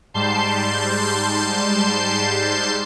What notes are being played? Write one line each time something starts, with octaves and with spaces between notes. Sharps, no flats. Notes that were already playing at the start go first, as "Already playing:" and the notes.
G#2 G3 A5 C6 G6 C7